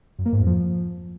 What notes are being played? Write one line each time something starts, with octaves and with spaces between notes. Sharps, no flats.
F#2
A#3
G#2
F2
F3